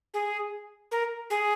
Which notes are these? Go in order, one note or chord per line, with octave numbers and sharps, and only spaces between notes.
G#4
A#4
G#4